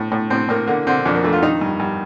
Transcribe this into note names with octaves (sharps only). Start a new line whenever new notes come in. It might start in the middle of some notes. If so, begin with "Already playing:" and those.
Already playing: A2
A2
A2 C4
A2 A#3
D3 A#3
D3 C4
F2 D4
A#3
F2 A3
F4
D#3 D#4
G2
G2